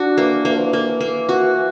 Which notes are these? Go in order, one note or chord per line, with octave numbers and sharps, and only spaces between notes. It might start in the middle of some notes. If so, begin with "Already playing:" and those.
Already playing: D4 F#4
E3 A#3
E3 A#3
F3
E3
A#3
A#3
F#4